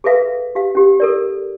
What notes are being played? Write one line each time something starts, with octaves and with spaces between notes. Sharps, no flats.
G#4 A4 B4 E5 F5
G4 F5
C#4 G4
A4 A#4 D5